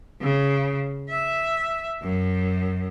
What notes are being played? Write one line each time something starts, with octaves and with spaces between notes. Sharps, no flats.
C#3
E5
F#2